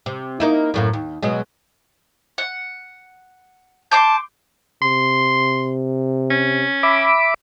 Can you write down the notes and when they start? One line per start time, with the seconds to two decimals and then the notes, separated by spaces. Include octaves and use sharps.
0.06 C3
0.40 A#3 D#4 E4
0.74 F#2 A2 A#3
0.93 D#2
1.23 B2 F#3 G#3
2.38 F#5
3.92 A5 C6 D6 G6
4.82 C3 C6
6.30 C#4
6.83 E5 B5 D6